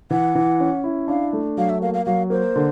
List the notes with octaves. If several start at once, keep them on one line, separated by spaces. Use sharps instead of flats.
E3 F#5
E3
C#4
E4
D4 F5
A3
F#3 F5
E5
A#3 F5
F5
F#3 F5
A#3 C5
D3